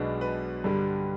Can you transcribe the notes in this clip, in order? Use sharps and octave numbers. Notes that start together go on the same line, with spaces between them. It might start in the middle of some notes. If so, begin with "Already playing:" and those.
Already playing: B1 B2 G#3 B3 D4
B4
G2 D3 G3